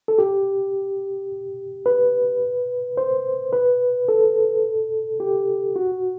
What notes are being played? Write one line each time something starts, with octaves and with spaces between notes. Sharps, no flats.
A4
G4
B4
C5
B4
A4
G4
F#4